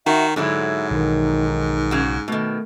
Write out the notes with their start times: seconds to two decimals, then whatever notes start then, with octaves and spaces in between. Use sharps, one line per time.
0.06 D#3 F#4 E5
0.36 G#2 D3 F#3 E4 E5
0.91 B1 D#3 E3
1.91 C#3 F#4
2.28 B2 D#3 A3